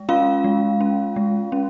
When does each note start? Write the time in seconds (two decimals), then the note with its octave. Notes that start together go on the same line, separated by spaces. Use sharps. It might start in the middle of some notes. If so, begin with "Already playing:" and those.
Already playing: G#3
0.09 C#4 F4 F5
0.44 G#3
0.81 C#4
1.16 G#3
1.52 C#4